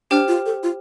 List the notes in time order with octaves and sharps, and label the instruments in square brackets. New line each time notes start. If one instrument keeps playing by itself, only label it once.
[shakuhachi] D4 [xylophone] G4 C5 G5 F6
[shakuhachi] F4
A4
F4